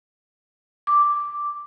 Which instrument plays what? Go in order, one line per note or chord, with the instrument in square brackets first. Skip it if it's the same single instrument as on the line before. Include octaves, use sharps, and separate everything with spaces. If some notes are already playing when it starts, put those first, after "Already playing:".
[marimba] D6